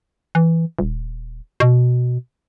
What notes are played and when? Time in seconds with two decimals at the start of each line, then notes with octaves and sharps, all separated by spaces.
0.35 E3
0.79 D#1
1.60 B2